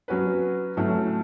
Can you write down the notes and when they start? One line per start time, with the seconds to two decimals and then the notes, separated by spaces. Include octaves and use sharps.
0.08 F#3 C#4 F#4 B4
0.77 A2 F#3 A3 C#4